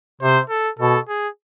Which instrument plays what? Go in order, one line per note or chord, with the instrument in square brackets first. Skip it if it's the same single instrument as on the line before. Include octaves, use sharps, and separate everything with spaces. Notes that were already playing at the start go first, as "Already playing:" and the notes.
[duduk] C3 [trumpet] C5
[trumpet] A4
[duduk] B2 [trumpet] A4
[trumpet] G#4